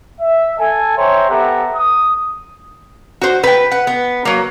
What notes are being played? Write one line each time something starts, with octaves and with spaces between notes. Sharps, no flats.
E5
A4 G#5
C5 C#5 E5 G5 A#5 C6
B3 G4 A4 E5 F#5 A#5
D#6
F#4 C5
B4 G5
F#5
B3
F#3 A#3